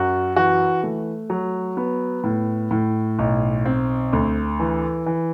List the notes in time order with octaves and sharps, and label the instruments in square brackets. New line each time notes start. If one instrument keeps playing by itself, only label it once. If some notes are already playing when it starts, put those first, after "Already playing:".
Already playing: [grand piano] F#2 F#4
E3 F#4
A3
F#3
B3
A2
A2
B1
C4
D2
E3
E3